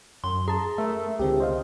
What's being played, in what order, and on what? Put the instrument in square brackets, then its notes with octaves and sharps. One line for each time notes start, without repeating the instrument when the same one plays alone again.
[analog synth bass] F#2 [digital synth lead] C6
[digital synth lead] G#4 [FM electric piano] A5 A#5
[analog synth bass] A3 [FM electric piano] A#4 E5
[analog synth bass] C#2 [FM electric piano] D3 C4 G4
[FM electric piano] C5 D#5 F5